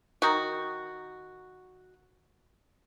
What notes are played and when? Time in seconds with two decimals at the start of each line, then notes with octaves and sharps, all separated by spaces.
0.22 D#3 F#4